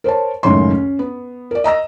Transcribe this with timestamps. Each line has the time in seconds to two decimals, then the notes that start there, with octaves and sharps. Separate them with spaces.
0.04 A#4 C5 C#5 A5
0.43 C#2 F#2 A2 D#3 C#5 C6
0.71 C#4
0.99 B3
1.51 A#4 D5
1.64 D#5 A#5 E6 A#6